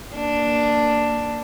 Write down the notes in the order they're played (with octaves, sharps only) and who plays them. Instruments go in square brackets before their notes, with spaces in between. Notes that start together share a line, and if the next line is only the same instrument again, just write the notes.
[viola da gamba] A#3 D4